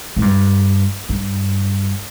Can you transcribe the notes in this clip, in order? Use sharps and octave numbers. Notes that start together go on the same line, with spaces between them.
A2
G2
G2